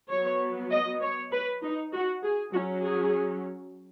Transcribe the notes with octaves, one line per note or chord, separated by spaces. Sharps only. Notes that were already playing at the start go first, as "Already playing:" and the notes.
F#3 B3 C#5
D#5
C#5
B4
D#4
F#4
G#4
F#3 C#4 F#4
G#4